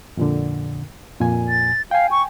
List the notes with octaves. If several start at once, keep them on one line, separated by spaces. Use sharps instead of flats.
F2 A#2 D3
F2 A#2 G#5
A6
F5 G5 G#5
C#6